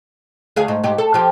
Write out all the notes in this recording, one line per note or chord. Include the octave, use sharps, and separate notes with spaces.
D2 G#4 F5
G#2
G#2 G4
A4
F3 G4